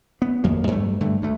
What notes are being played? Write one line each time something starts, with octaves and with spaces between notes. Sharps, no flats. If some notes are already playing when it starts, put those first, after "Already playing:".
B3
G#1 F2 F#3 A#3
G2 F#3 G#3 A3
G2 D3 A3
D2 A3